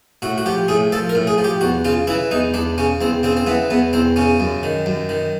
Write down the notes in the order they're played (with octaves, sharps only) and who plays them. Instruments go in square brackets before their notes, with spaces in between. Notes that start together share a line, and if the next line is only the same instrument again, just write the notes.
[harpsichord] A2 F#4
F#4
F3 G4
A2 G#4
F3 A4
A#4
A2
G#4
F3
G4
E2 F#4
C#3 F4
E3 E4
E2 D#4
E2 D4
C#3 C#4
E2 C4
C#3 C4
C4
E3 B3
E2 B3
E2 C4
C#3 C#4
F#2
D#3
F#2
D#3